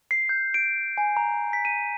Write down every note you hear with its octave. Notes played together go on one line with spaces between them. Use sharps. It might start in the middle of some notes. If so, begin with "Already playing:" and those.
C7
G6
D7
G#5
A#5
B6
D#7